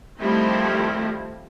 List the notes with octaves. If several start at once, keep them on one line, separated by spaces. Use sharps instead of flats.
D#3 F3 G3 A3 C4 E4